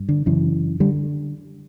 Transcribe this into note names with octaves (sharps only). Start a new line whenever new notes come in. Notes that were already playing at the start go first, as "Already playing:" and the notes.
Already playing: G2
D3
F#2 C#3 E3
D3 G3